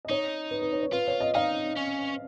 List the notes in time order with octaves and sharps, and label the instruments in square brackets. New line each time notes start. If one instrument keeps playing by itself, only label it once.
[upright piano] D#5
[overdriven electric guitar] D#4 [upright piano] C#5
[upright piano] B4
B4
C#5
C#5
[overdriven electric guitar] F4 [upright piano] B4
[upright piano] C#5
D#5
[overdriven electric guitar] D#4 [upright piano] F5
[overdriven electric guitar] C#4